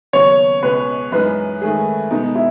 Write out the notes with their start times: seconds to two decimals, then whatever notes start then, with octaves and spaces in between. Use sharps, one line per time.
0.13 D#2 C#3 F#3 B3 C#5
0.63 C#2 B2 G#3 B4
1.12 F#2 E3 G#3 D#4 B4
1.61 G#2 D#3 A3 G#4
2.11 B2 G#3 B3 D#4
2.35 E4